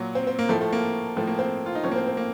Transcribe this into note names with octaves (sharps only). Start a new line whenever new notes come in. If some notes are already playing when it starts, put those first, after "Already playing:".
Already playing: A#2 F#3
C4
C4
A#3
A2 F3 A3
A3
A#3
A2 F3 A3
A#3
C4
F4
D#4
A2 F3 C#4
A#3
C4
C4
A#3